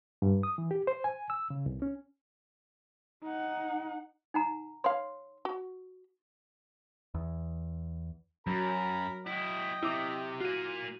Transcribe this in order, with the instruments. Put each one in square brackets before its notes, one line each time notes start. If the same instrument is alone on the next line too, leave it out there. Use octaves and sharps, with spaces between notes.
[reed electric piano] G2
D#6
E3
G4
C5
G#5
E6
C#3
C2
C#4
[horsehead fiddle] D#4 F#5
[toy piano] D#4 F#5 A#5
[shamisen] C#5 F5 [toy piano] C6
[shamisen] F#4
[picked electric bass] E2
[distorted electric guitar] F#2 [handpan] F#3 [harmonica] A#4 A#5 B5
[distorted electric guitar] E4 F#4 [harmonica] D#5 G5
[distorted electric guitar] C3 [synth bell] E4 D6
[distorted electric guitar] A#3 F4 [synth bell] F#4 D#7